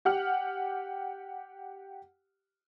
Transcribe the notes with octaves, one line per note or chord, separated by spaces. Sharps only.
G4 F#5 F6